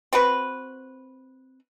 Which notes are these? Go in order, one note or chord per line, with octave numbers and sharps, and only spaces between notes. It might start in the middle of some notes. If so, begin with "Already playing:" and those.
C4 F#4 B4